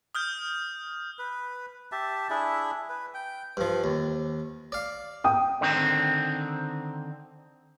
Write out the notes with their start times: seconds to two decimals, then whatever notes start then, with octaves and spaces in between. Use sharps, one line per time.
0.15 D#6 F6 G6
1.19 B4
1.92 G4 E5 A5
2.30 D4 E4 G#4 E5
2.89 B4
3.14 G5
3.57 G2 F3
3.84 D#2
4.72 D5 F5
5.24 G5 D#6
5.61 D3 D#3 C4